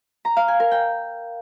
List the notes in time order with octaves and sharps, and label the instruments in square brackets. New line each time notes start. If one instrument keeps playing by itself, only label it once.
[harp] A#5
F5
G#5
A#4
G5